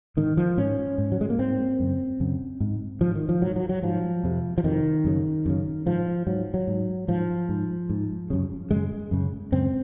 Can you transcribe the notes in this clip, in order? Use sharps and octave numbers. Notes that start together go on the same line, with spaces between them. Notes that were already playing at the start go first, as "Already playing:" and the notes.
G#2 D#3
F3
G#2 C#4
G#2
F#3
G#3
A#3
G#2 C4
F#2 C#3
F#2 C#3
G#2
G#2 F3
D#3
F3
G#2 F#3
F#3
F#3
G#2 F3
F2 C3
F3
F2 C3 D#3
F#2 C#3
F#2 C#3
G#2 F3
G#2 F#3
F#3
G#2
G#2 F3
G#2
G#2
F#2 C#3
F#2 C#3 G#3
F#2 C#3
F#2 C#3 C4